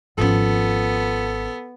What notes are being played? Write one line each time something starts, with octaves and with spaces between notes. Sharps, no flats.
G#1 F3 B3 C#4 A4